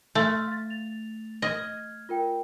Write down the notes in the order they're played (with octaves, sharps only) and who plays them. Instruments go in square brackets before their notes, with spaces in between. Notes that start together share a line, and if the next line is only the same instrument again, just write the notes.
[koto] A3 [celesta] C6 F6
[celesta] F5 A6
A6 F7
[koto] D#5 [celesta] F6 G#6
[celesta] F4 A#4 G5